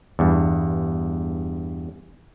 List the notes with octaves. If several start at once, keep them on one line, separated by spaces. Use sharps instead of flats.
E2 G2